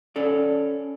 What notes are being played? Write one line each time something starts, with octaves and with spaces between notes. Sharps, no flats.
C#4 A4 D5